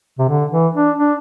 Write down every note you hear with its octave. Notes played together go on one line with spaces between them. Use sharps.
C3
D3
E3
D4
D4